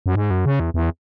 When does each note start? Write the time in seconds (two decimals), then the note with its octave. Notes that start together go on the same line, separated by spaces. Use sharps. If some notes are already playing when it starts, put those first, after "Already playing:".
0.06 F#2
0.15 G#2
0.30 F#2
0.45 C#3
0.60 E2
0.74 E2